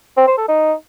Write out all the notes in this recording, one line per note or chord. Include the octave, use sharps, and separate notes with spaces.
C4
C5
A4
D#4